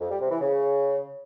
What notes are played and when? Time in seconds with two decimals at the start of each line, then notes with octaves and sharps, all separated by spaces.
0.01 F2
0.11 G3
0.21 C3
0.31 E3
0.41 C#3